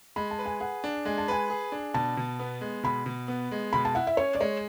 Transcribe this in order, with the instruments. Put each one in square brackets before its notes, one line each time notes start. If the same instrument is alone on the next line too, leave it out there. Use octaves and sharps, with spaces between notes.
[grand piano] G#3 [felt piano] B5
[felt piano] A5
[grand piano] B4
[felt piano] G#5
[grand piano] G#4 [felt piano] F#5
[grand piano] D4
[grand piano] G#3 [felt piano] G#5
[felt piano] A5
[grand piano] B4 [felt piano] G#5
[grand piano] G#4
D4
[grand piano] B2 [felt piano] A5
[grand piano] B2
B3
G#3
[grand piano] B2 [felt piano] B5
[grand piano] B2
B3
G#3
[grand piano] B2 [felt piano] B5
[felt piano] A5
[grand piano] E4 [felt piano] F#5
[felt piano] E5
[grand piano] C#4 [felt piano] C#5
[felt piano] D5
[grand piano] G#3 [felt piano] C#5